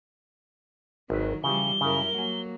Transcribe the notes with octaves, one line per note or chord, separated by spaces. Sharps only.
G#1 D#3 F#3 B4
C#3 E3 F3 G3 G4 G7
F#2 C#3 E4 A#4 A#5
F#3 A#3 F#5 G#5